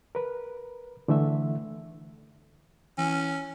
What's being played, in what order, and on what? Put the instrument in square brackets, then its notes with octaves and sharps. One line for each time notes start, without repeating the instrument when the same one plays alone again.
[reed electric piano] A#4 B4
D3 E3 A3 E5
[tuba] E3 [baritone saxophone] C#4